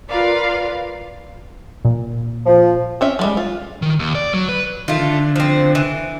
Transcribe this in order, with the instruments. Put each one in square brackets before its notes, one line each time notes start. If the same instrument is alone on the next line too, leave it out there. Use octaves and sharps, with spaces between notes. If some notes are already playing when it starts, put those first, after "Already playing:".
[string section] F4 A#4 B4 D5 F5
[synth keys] A#2
[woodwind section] F3
[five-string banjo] C4 C#4 E5
F3 G3 G#3
F4
[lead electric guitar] D#3
D#2
D5
F#3
B4
[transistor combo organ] D#3 [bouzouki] A3 F4
[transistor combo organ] D3
[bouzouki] F3 C4
E3